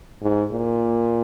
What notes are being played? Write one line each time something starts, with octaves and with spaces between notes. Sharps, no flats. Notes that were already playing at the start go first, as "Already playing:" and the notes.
G#2
A#2